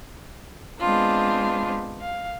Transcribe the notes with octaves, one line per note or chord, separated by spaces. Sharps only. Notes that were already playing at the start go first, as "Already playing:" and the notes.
G#3 B3 C4 D4 F4
F5